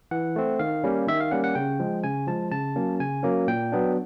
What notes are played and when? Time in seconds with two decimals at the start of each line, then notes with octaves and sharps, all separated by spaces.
0.11 E3 F#5
0.36 A3 C4
0.59 D#3 F5
0.84 G3 A#3 C#4
1.07 D#3 E5
1.20 F5
1.31 G3 A#3 C#4 F#5
1.44 F#5
1.55 C#3 G5
1.79 F3 G#3
2.04 C#3 G#5
2.27 F3 G#3 A5
2.52 C#3 A5
2.76 F#3 A#3 C#4
3.00 C#3 G#5
3.23 F#3 A#3 C#4
3.48 A#2 G5
3.72 F#3 B3 D4